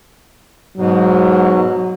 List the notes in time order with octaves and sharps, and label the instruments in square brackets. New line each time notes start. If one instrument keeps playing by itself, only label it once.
[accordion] G#2 B2 [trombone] F#3